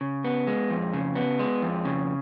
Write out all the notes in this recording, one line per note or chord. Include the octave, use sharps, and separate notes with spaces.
C#3
B3
G#3
F2
C#3
B3
G#3
F2
C#3